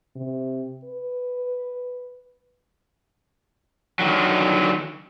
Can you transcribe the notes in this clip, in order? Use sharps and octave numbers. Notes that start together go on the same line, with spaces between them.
C3
B4
D3 D#3 F#3